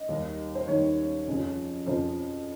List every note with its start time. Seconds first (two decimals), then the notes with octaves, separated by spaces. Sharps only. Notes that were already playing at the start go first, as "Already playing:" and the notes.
Already playing: D#5
0.09 D#2 D#3 G3
0.55 C5
0.67 D#2 D#3 G3 C#5
1.28 F2 C#3 F3
1.86 F2 C#3 F3 C5